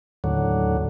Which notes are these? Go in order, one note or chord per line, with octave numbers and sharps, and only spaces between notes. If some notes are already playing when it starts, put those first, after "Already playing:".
D#2 A2 D3 F#3